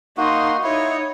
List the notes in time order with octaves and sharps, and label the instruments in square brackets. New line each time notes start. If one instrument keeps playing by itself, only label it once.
[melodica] A#3 F#4 [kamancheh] D#4 C6
[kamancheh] D#4 C#5 [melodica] E4